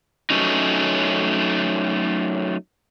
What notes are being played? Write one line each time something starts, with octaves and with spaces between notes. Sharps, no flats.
F#3 A3 C#4 D#4